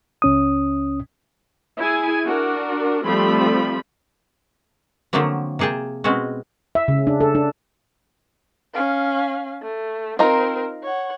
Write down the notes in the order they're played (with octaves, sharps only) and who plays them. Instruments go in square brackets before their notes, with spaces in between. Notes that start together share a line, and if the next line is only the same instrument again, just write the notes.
[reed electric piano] C#2 C#4 D#6
[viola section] E4 G#4 G#5
D4 F#4 A#4
F3 G3 A3 C4 B5
[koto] D3 F3 F#3 A3 A#3 C4
C3 A#3 G#4 G5 A5
B2 G#3 C4 C#4 F#4
[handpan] E5
C#3
D4
A4
D4
[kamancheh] C#4 F5
A3
[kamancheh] C4 A#4 [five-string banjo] D#4 F4 A#5
[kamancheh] C#5 F#5